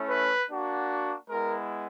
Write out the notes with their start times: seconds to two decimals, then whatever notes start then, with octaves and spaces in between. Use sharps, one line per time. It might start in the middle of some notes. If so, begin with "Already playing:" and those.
Already playing: A3 C#4 E4
0.09 B4
0.50 A#3 D4 F#4
1.30 G#3 B3 E4 A#4